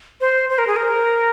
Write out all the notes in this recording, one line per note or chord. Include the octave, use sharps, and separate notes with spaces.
C5
C5
A#4
G#4
A#4